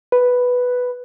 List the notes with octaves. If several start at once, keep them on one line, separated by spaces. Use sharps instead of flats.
B4